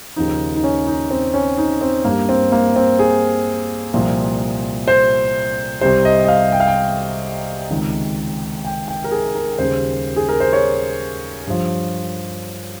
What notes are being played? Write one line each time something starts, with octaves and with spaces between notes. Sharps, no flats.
D#2 C#3 F3 D#4
D#4
C#4
D#4
C4
C#4
D#4
C4
G2 G3 A#3
C4
A#3
C4
G#4
C2 A#2 F3
C5
C2 C3 G3 C5
D#5
D#5
F5
G5
F5
G5
C#2 C3 D#3
G5
G5
A#4
G#4
A#4
D#2 C#3 G3 C5
G#4
A#4
C5
C#5
G2 F3